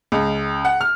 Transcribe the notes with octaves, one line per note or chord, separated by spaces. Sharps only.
C#2
F#5
F6